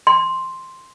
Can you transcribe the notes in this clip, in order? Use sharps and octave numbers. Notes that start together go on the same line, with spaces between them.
C6